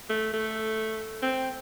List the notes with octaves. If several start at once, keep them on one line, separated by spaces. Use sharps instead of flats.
A3
A3
C4